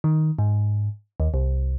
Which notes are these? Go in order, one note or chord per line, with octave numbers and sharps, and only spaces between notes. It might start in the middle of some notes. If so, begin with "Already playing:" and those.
D#3
G#2
D#2
C2